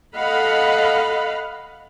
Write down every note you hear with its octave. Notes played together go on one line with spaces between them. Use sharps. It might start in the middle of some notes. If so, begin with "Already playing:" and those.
A4 D#5 F5 F#5 B5